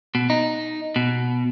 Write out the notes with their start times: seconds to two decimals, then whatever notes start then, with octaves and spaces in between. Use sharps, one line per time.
0.15 B2
0.30 D#4
0.96 B2